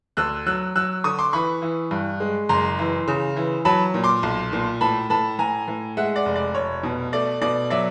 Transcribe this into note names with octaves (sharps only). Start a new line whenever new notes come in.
D2 E6 F#6
F#3 E6 F#6
F#3 E6 F#6
D3 C#6 D#6
C6 D6
E3 B5 C#6
E3
G2
G#3
F#1 A#5 C6
E3
C#3
E3
F#3 A5 B5
A#2
C6 D6
B1
A#2
A2 A5 B5
A2 A5 B5
A2 G#5 A#5
A2
G#3 E5 F#5
D5
F1
D5
F1 C#5
B2
A3 D5
B2 D5
F#3 D5 E5